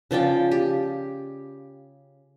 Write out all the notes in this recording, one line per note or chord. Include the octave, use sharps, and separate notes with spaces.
C#3 F3 D5 G5
G4